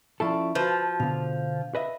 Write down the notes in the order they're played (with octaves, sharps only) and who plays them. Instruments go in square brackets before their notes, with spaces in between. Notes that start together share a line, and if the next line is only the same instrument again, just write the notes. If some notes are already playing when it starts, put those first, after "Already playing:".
[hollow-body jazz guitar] F3 E4 A4 [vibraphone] C#4 D5 C#6
[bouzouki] F3 [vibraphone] F#4 A5 C6 [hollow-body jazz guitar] B4
[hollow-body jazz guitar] B2 D3 [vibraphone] F5
[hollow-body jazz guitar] B4 D#5 E5